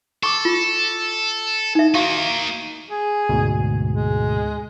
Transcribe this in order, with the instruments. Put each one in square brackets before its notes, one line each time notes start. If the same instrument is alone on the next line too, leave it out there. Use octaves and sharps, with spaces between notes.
[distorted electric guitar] A4 [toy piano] C#6 D6
[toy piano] F4
D#4 E5
[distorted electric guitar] A#3 D#4 [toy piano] F#4 F5 C#6
[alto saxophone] G#4
[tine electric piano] D2 G#2 B2
[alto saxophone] G#3